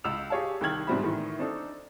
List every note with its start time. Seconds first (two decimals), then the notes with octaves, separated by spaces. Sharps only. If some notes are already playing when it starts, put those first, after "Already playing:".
0.04 C#2 E6 F7
0.30 G4 G#4 C#5 F5 A5
0.61 C2 D#3 G5 F6 G#6 F#7
0.87 G#2 B2 G3 C4 E5 B5
1.03 A2 D#3 E3
1.39 C4 D4 D#4 A4